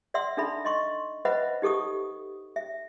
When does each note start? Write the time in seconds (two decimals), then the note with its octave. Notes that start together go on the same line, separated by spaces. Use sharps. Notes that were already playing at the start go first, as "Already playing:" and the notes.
0.14 D5 E5 F#5 C6 E6
0.37 D4 D#4 A4 E5 B5
0.65 D#5 C6 C#6
1.25 B4 C5 D#5 E5 F#5 B5
1.62 D#4 G4 A4 C#6 D#6
2.56 E5